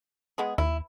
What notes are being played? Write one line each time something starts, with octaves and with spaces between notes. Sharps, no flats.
G#3 B3 G#4
D#2 E4